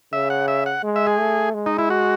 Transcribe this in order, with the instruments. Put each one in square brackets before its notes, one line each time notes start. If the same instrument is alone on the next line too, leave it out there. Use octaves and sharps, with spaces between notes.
[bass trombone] C#3 [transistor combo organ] E5
[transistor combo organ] F#5
E5
F#5
[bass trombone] G#3
[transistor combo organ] E5
G#4
[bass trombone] A3
G#3
[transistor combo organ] D#4
E4
F#4